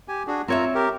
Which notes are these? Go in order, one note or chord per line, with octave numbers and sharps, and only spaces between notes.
G4 G#5
D4 F#4 G#4
C4 F4 C#5 E5 A#5
G4 A#4